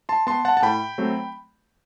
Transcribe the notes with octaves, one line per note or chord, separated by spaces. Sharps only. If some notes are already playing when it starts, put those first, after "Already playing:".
A5 C6
B3 A5 C6
F#5 A5
A5
A2 G5 B5
F#3 A3 C4